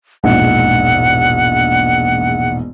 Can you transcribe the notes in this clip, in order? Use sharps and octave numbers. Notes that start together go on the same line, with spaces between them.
E1 A#1 G#2 F#5